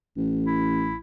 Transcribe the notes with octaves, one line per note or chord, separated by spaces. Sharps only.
A1
E4